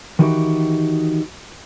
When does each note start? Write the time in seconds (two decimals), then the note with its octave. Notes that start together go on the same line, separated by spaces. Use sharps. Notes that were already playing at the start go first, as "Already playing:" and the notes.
0.19 D#3 E3 D#4 F#4 G4